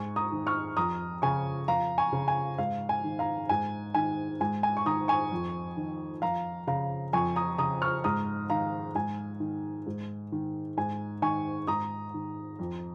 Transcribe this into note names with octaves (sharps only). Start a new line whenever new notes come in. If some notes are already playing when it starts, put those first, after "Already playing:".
Already playing: G#2 G#5 C#6
A#5 D#6
D#3
C#6 F6
F2 A#5 D#6
C#3 G#5 C#6
F2 F5 A#5
G#5 C#6
C#3
G#5
G#2 F5
G#5
D#3
F5 A#5
G#2 G#5
D#3 G#5
G#2 G#5
G#5
C#6
D#3 A#5 D#6
G#5 C#6
F2
D#3
F2 F5 A#5
C#3 F5 A#5
F2 G#5 C#6
A#5 D#6
C#3 A#5 D#6
C#6 F6
G#2 A#5 D#6
D#3 F5 A#5
G#2 G#5
D#3
G#2
D#3
G#2 G#5
D#3 G#5 C#6
G#2 A#5 D#6
D#3
F2